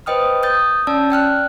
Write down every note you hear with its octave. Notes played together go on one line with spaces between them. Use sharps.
B4 C5 D#5 G5 D#6 F6
D#6 G6 A6
C#4 D5 A5 E6
D5 G5 F6 F#6